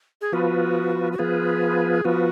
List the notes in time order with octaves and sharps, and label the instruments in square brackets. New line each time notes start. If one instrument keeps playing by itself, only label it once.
[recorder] G#4
[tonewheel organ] F3 B3 F4 B4 [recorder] F#4
[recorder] F#4
[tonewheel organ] F3 B3 F4 B4 [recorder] G#4
[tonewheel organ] F3 B3 F4 B4 [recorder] F#4